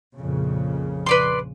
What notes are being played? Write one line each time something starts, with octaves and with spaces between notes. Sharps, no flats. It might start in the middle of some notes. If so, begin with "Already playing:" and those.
A#1 F2 C#3
B4 D5 C6